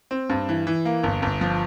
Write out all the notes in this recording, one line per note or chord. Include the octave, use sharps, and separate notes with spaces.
C4
G2
E3
E3
A#3
G1
G1
F3